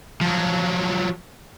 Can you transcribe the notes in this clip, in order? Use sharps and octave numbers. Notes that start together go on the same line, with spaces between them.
F3 F#3